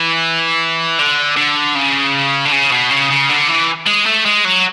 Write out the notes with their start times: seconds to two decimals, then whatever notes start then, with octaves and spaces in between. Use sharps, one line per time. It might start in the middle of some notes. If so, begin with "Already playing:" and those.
Already playing: E3
0.99 D3
1.37 D3
1.75 C#3
2.45 D3
2.52 C#3
2.72 B2
2.90 C#3
3.10 C#3
3.29 D3
3.49 E3
3.87 G#3
4.06 A3
4.26 G#3
4.45 F#3